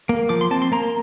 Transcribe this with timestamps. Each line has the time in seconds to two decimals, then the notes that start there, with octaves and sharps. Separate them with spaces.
0.09 A#3
0.29 F3 D6
0.41 C6
0.51 C4 A5
0.62 C6
0.72 A#3 A#5